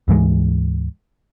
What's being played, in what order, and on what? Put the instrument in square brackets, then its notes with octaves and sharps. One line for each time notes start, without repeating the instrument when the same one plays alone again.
[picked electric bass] D2 G#2 E3 G#3